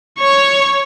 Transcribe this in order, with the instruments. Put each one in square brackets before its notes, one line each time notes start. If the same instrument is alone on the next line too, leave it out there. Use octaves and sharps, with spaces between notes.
[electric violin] C#5 C#6